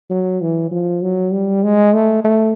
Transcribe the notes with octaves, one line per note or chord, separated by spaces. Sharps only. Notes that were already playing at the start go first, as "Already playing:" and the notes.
F#3
E3
F3
F#3
G3
G#3
A3
A3